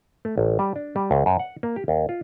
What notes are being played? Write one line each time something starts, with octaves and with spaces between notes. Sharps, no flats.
A3
A1
G3
D4
G3
C#2
F#2
F#5
A#3
G4
D#2
F4